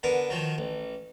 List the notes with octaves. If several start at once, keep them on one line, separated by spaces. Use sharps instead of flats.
D3 B3 A#4
D#3 F3 F#3
A1